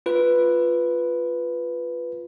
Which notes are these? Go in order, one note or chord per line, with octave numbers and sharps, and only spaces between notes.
F4 B4